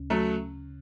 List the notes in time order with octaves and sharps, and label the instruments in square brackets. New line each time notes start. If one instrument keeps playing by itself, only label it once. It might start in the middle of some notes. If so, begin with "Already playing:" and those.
Already playing: [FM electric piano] D2 C#3 C#4
[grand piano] F#3 A3